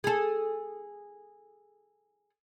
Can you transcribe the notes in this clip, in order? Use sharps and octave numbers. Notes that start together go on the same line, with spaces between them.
G#4 A4